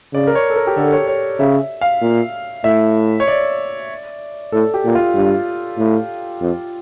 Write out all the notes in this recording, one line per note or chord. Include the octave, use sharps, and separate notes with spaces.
C#3 D5
A#4
C#5
A4
A#4
G4
D3 A4
C#5
C#5
C#3 E5
F5
A#2
A2 E5
C#5
D5
A2 A4
G4
A#2
F4
G2
A2
F2